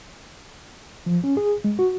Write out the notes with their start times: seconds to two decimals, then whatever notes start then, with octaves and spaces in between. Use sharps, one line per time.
1.06 F3
1.24 C#4
1.37 G#4
1.64 G#3
1.79 F#4